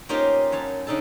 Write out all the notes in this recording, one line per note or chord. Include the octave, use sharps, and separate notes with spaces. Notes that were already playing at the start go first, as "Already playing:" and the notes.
A#3 C#4 D#4 F4 G4 C5
F#2 C#5 A5
C#3 D4 D#4 A4 A5